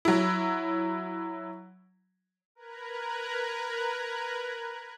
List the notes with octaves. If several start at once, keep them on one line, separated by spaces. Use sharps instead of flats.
F#3 E4
A#4 B4 A#5 F#6 G#6